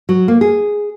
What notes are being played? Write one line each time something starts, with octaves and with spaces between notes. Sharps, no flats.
F#3
A#3
G#4